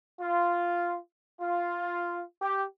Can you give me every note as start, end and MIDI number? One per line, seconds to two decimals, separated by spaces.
0.20 0.97 65
1.41 2.22 65
2.42 2.64 67